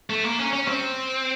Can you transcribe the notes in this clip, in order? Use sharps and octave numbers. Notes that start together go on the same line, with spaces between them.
A3
A#3
C#4
C#4
C4